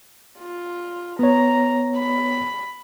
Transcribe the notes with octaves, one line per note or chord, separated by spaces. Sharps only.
F4
B3 C#5 A#5
B5